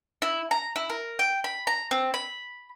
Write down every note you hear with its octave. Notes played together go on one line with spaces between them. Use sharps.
E4
A#5
E4
A#4
G5
B5
A#5
C4
B5